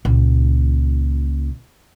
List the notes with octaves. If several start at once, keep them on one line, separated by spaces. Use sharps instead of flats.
C#2 A#2